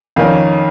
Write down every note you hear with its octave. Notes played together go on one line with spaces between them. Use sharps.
F2 D#3 A#3 C#4 F5